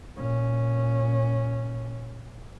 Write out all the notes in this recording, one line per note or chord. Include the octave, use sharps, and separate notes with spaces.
A#2 C#4